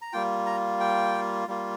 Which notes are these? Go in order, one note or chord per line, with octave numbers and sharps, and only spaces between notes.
A#5
G3 A#3 F4 G5
A#5
G5
G3 A#3 F4